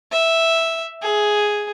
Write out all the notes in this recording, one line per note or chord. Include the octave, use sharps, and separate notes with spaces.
E5
G#4